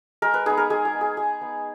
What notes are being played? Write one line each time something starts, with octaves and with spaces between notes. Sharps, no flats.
G#3 A#4
B4
B3 D#4 G#4
A#4
G#3 G#4
G#4
B3 D#4
G#4
G#3 G#4
B3 D#4